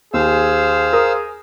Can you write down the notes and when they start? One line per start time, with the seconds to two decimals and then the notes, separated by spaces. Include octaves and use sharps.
0.14 D#2 G#4 C5 F5 E6
0.93 A#4 D#6